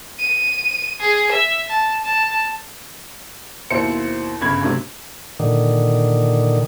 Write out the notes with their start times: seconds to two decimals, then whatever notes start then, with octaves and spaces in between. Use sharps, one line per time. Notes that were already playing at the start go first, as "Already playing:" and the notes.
0.19 D#7
1.00 G#4
1.31 E5
1.68 A5
2.04 A5
3.70 D#2 B2 E4 C5 C#7
4.41 G1 C#3 B5 G#6
4.61 C3 F#3 A3 D4
5.40 A#2 D3 D#3